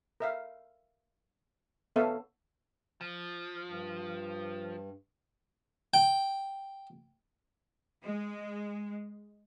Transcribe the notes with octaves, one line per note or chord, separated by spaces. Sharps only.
A#4 E5 F5
B3 A4 C#5 E5 F5 A5
F3
G2
G5
G#3